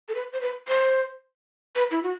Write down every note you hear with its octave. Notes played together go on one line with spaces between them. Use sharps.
A4
B4
C5
B4
C5
B4
E4
F#4